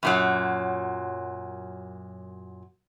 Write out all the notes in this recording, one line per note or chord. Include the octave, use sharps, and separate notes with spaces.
F#2 A#2 F#3